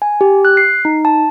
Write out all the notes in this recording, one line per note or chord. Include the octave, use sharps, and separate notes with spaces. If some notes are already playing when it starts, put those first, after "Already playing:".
G#5
G4
F#6
C7
D#4
A5